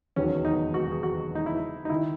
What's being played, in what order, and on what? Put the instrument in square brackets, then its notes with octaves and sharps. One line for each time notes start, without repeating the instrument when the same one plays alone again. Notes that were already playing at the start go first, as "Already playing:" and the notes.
[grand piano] E1 D#2 D#3 F#3 B3 [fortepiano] C#4
[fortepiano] D#4
F#4
G#4
F#4
D#4
E4
D#4
[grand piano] D#3 [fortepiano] E4